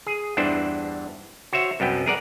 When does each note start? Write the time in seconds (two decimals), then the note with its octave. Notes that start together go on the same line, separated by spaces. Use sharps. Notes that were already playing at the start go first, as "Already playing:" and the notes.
0.06 G#4
0.37 E2 G2 E3 D4 C5
1.53 F#4 C5 C#5 E5
1.80 C2 F#2 B3 G5
2.06 G#4 A#4 D5 F#5